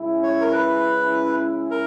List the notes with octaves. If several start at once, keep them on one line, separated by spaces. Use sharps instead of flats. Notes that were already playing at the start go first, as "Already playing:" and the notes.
Already playing: C#3 G#3 C#4 E4
C#5
A#4
B4
A#4